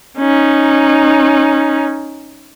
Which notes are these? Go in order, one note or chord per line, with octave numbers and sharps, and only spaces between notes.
C#4 D#4